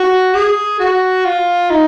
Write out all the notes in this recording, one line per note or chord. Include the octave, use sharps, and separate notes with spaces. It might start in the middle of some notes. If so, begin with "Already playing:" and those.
Already playing: F#4
G#4
F#4
F4
D#4